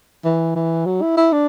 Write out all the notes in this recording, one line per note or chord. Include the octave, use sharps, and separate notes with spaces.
E3
E3
F#3
E4
E4
D4